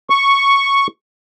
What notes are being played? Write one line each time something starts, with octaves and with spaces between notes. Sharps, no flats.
C#6